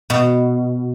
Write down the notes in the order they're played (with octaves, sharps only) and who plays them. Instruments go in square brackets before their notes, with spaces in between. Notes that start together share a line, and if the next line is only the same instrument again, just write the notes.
[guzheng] B2